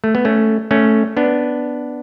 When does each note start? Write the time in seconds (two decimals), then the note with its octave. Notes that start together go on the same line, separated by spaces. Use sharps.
0.04 A3
0.15 B3
0.25 A3 C#4
0.71 A3 C#4
1.17 B3 D4